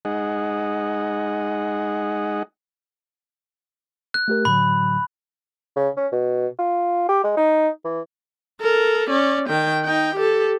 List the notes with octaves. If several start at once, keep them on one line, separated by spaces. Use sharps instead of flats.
G#3 D#4 G#4 D#5 F#5
F#6
A3 G4 A#4
A2 D3 F#3 B5
C#3
C#4
B2
F4
G4
G#3
D#4
E3
A4 A#4
C#4 D5
D#3 G5
D#4 G5
G4 A4